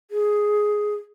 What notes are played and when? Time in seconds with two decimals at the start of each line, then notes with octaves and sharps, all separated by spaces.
0.11 G#4